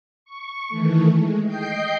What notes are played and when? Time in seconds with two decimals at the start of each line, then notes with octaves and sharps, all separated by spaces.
0.25 C#6
0.69 D#3 E3 A3
1.13 G#3
1.45 D#5 G5 G6 C7